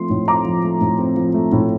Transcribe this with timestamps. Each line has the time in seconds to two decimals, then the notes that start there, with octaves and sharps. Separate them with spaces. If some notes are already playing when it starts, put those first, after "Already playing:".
Already playing: F3 A3 C4 C6
0.10 A2
0.28 C4 A#5 D6
0.45 F3
0.63 A3
0.81 A2
0.99 C4
1.17 F3
1.34 A3
1.52 A2